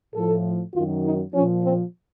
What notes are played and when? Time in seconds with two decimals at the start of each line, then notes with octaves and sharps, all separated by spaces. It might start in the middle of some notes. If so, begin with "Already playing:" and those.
0.15 A2 F3 A4
0.74 F#2 D#3 F#3 F4
1.04 D#4
1.34 A#2 F3 C#4
1.64 C4